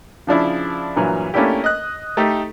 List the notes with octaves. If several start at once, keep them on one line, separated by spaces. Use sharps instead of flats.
C#3 F3 D4 E4
G2 A#2 E3 F#3
A3 A#3 C#4 D4 E4 G4
D#5 F#6
A3 D#4 G4 A4